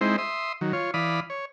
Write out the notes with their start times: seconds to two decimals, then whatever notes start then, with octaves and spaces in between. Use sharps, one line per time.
0.01 G#3 C4 D#4 E4 C5
0.18 E5 C6 D#6
0.61 D#3 F#3
0.73 F4 C#5
0.94 E3 D5 F5 B5 D#6
1.30 C#5